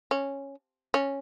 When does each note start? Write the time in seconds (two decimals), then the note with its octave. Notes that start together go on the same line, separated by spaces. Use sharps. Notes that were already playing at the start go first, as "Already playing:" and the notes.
0.11 C#4
0.94 C#4